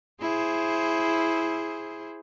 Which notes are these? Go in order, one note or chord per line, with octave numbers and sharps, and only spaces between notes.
E4 G#4 C5